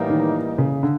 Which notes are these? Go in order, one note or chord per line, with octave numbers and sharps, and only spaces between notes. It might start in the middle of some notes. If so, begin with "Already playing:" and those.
Already playing: A2 E3 G3 A#3 D#4
D#3
C#3
D3